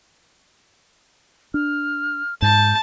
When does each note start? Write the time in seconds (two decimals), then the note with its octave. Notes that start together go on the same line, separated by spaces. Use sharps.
1.54 D4 F6
2.42 G#2 A5 G6